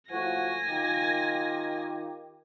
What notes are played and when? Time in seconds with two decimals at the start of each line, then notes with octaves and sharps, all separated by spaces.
0.10 A2 F3 F#4 G#5 A#6
0.68 D#3 F4 G4